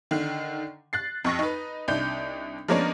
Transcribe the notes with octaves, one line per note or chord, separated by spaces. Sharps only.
D3 D#3
F#6 A6 C7
F2 C#6 A#6
D#4 B4
C2 D4 D#4 G6
F3 G#3 A#3 B3 C#4 D4